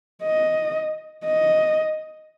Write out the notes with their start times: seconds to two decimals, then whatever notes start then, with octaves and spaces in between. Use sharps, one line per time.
0.23 D#5
1.25 D#5